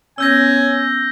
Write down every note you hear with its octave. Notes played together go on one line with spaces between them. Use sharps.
B3 C#4 C#5 G#5 E6 G6 A#6